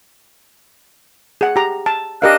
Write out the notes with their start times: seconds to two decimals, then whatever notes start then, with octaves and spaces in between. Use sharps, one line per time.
1.41 G#4 F#5
1.56 G4 A#5
1.86 A5
2.22 D4 G4 A#4 D#5 F5 F#6